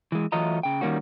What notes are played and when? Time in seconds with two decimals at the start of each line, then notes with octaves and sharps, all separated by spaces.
0.12 E3 G#3
0.32 E3 F#3 A3 F4 D#5 A#5
0.63 C#3 G5
0.81 D#3 G3 A#3 C#4 F#4